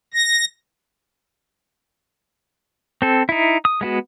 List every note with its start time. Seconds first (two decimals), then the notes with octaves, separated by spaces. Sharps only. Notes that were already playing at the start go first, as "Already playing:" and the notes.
0.14 A#6
3.02 C4 A4
3.29 D#4 E4
3.65 D#6
3.81 G#3 B3 F#4